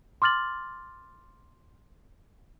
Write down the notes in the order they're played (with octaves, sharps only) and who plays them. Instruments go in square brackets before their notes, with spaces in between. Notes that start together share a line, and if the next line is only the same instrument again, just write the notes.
[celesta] C6 D6 F6 A6 F#7